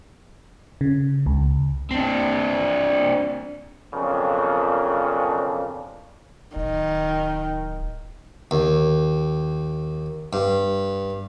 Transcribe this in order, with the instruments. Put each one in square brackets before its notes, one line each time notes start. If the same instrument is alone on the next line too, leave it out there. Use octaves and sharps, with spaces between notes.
[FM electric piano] C#3
C#2
[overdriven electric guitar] C4 D4
[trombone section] B1 F2 C#3 F3 D4 A#4
[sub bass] D1 [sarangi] D#3
[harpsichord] D#2
G2